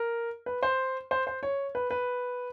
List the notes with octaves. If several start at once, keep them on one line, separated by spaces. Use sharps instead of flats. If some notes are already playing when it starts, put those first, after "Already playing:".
Already playing: A#4
B4
C5
C5
C5
C#5
B4
B4